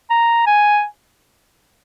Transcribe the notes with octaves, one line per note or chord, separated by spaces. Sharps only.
A#5
G#5